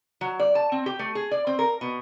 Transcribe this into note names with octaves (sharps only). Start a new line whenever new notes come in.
F#3
D5
A5
C4
G4
A3
G#4
D5
C4
A#4
B2